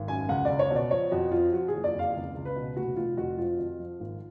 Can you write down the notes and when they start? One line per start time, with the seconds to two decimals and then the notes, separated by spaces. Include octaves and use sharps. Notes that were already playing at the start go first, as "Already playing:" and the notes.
Already playing: G#1
0.08 F#2 G#5
0.29 C#2 F#5
0.45 C#2 D5
0.59 C#5
0.70 B2
0.76 D5
0.91 F3 C#5
1.11 F2 F#4
1.32 F3 F4
1.53 F3 F#4
1.68 F#1 G#4
1.84 D5
1.94 F2
1.99 F5
2.15 C#2
2.35 C#2
2.45 B4
2.56 B2
2.76 F1 F#4
2.97 F1 F4
3.17 F2 F#4
3.38 F3 F4
3.59 F2
3.79 F3
4.00 G#1